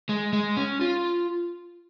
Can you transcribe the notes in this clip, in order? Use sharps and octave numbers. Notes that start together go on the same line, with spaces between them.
G#3
G#3
C#4
F4